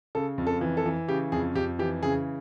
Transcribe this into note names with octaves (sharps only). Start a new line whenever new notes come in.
C#3 A4
F2
A4
E3
A4
E3
C#3 G4
F2 G#4
F2 G4
E3 G4
C#3 G#4